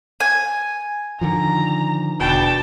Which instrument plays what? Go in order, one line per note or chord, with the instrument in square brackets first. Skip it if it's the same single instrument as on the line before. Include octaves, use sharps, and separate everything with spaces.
[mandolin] G#5
[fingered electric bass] D3 D#3 F3 [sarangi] A#5
[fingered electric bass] E1 [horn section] B2 D4 G5 [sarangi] A5